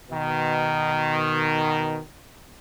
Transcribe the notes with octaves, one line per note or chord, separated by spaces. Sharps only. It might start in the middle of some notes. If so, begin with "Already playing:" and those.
B2 D#3